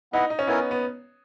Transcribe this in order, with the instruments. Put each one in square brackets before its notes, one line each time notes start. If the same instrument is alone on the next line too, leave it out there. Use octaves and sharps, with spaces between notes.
[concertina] B3 E4 B4 D#5 F#5 [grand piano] D#4
[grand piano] D#4
C#4
[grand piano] B3 [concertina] E4 A#4 C#5 G#5
[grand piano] B3